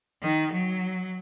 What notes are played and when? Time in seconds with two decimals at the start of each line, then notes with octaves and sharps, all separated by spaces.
0.22 D#3
0.52 F#3